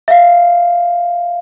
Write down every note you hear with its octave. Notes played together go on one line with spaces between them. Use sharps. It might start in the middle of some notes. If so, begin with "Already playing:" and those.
E5 F5